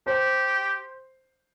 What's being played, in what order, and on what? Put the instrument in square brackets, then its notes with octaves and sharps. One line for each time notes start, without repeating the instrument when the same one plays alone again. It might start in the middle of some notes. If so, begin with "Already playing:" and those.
[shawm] G4 [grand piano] C5